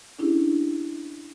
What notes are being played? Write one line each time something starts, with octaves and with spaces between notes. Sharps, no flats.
C#4 D4 E4 G4 G#4